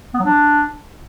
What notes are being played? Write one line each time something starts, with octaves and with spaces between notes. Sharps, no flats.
B3
F#3
D4